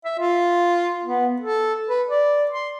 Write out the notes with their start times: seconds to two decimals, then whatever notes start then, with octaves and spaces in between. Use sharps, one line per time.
0.05 E5
0.19 F4
1.04 B3
1.41 A4
1.88 B4
2.08 D5
2.51 C6